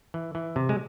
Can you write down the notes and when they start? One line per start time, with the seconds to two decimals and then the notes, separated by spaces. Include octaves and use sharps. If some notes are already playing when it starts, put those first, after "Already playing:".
0.14 E3
0.35 E3
0.56 C3
0.69 G#3